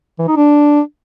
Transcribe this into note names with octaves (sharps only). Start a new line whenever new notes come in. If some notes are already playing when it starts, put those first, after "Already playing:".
E3
D#4
D4